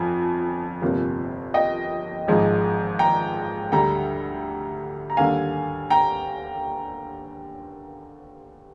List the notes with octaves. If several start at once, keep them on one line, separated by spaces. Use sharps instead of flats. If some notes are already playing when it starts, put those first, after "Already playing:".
Already playing: G1 F2 F3 G#5
G1 F2 C3 G3 A#3
D#5 G5
G#1 G#2 F3 G#3
G5 A#5
D2 D3 G3 G5 A#5
A#5
D#2 D3 G3 A#3 F5 G#5
G5 A#5